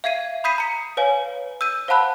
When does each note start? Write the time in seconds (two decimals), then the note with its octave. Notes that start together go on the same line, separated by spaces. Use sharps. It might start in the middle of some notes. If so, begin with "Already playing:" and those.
0.04 E5 F5 G#6 C7 D#7
0.44 B5 D#6 G6 B6 C7 D#7
0.58 A#5 C#7
0.97 B4 C#5 F5 G#5
1.61 E6 G6 D#7
1.88 C5 F5 F#5 A5 B5 F#6